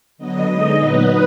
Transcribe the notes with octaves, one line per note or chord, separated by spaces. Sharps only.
D3 F#3 B3 D#5
D3 G#3 D#4
A#2 F#3 B3 D#4 B4